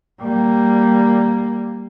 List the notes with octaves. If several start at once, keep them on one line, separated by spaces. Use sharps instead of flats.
G3 A#3